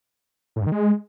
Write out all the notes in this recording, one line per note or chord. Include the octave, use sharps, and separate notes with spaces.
A2
G2
D#3
G#3